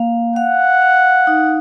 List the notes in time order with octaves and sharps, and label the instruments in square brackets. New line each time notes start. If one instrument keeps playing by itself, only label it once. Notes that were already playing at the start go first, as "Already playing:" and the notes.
Already playing: [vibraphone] A#3 F5
[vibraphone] F5 [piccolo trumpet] F#5
[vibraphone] F5
D#4